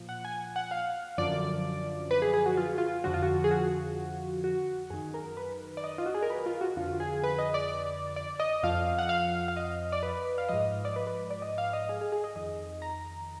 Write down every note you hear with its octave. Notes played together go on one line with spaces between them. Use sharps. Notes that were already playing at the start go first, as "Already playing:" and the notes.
Already playing: A#2 F3
F#5
G#5
F#5
F5
F#2 D3 F3 D5
B4
G#4
G#4
F#4
F4
F4
F2 D3 F3 F#4
F4
F#4
G#4
F#4
F#4
F#2 D#3 G#4
A#4
B4
D5
D#5
F4
F#4
G#4
A#4
B4
F4
F#4
F2 D3 F3 F4
G#4
B4
D#5
D5
D5
D#5
F2 F3 F5
F#5
F5
F5
D#5
D5
B4
F5
G#2 F3 D#5
D5
B4
B4
D5
D#5
F5
D#5
G#4
G#4
G#4
D#5
F2 D#3 D#5
A#5